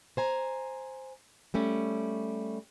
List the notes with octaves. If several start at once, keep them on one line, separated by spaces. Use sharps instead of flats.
C5 G#5 A#5
G3 A3 C#4